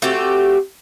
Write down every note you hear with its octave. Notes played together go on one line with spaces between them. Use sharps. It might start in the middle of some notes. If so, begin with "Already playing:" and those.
A3 C4 F#4 G4